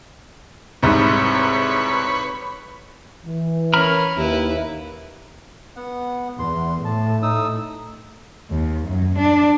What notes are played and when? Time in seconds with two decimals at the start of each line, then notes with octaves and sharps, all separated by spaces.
0.83 C2 G#2 C4 D#4 B4 C#5
3.26 E3
3.74 C#4 A#4 A#5 B5 F6
4.17 D#2 E4 B4
5.76 B3 F#5
6.39 E2 C6
6.85 A2 A3 A5
7.23 D#4 D#6 E6
8.50 D#2
8.87 F#2
9.18 D4